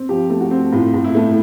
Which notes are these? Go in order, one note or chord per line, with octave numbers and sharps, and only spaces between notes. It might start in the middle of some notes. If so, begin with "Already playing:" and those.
Already playing: C4
F3 G4
A3
F#4
C4
A2 F4
A2
E4
A3